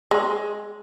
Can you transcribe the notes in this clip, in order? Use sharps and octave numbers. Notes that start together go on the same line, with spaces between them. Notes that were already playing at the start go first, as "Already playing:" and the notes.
G#3